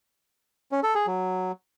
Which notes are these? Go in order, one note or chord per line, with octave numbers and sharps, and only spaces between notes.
C#4
A4
G#4
F#3